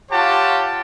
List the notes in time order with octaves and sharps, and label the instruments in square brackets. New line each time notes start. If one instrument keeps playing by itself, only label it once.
[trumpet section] F4 G4 C#5 F#5 A5